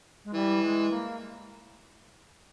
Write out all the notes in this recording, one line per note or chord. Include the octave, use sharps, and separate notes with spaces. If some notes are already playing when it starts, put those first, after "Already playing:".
G#3
E3 G3
G#3
A#3